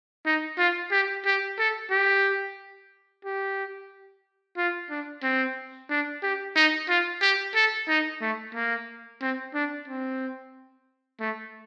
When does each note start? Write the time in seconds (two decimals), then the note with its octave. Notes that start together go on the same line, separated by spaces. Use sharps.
0.26 D#4
0.58 F4
0.92 G4
1.26 G4
1.59 A4
1.91 G4
3.25 G4
4.57 F4
4.90 D4
5.23 C4
5.90 D4
6.23 G4
6.56 D#4
6.89 F4
7.21 G4
7.55 A4
7.88 D#4
8.21 A3
8.55 A#3
9.21 C4
9.54 D4
9.88 C4
11.20 A3